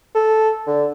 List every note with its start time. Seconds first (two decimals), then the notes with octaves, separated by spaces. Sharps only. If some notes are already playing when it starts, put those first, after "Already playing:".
0.15 A4
0.67 D3